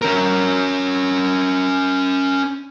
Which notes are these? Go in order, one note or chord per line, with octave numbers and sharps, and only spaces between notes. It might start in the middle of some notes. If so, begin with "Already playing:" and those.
C#4 A#4